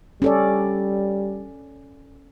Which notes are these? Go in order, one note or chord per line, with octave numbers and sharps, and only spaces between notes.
G3 C#4 A4 D5